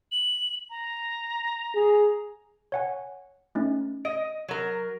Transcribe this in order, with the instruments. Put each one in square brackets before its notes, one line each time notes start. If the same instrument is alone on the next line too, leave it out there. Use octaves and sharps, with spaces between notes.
[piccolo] F#7
A#5
[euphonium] G#4
[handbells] C#5 F#5 G#5
A3 C#4 D#4
[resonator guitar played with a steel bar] D#5 [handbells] D7
[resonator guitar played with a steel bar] F#3 A#4